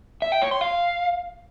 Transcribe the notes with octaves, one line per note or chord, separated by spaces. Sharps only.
E5
G5
C#5
C6
F5